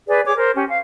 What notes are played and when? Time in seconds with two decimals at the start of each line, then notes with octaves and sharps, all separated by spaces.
0.08 G#4 B4 D5
0.26 G#4 C#5 D6
0.38 A#4 C5
0.55 C#4 G4
0.69 F5